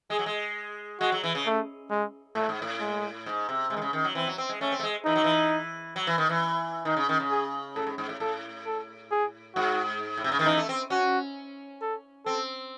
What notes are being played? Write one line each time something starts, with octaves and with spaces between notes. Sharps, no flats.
G#3 G#4
F#3
G#3
G#3 F#4
F#3
E3
C#3
A3
G#3
A2 A3
G#2
A2
G#3
G#2
C3
C3 G#3
D#3
C#3
D#3
F#3
E3 C4
F#3
C4
G#3
A3 C#4
C4
A3
G#3
E3 D#4
F#3
E3
F#3
E3
D#3
E3
D#3 D#4
C#3
D#3
C#3
G#4
A2 A4
G#2
G#2
A2
A2 A4
A4
G#4
G#2 F#4
A2
C3
C#3
D#3
E3 D#4
A3
C4
C#4 F#4
A4
C4 A4